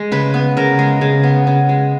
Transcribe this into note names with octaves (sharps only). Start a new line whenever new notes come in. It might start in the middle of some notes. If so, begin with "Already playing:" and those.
Already playing: G#3
C#3 B4
B3
C#3 A#4
G#3
C#3
B3
C#3
G#3